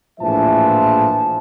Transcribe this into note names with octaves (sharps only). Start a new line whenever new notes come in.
A#1 A2 E3 F3 E5 A5